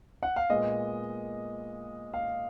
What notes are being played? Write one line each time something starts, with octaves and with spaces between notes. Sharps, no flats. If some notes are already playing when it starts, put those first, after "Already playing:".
F#5
F5
A#2 G#3 B3 D#5
F5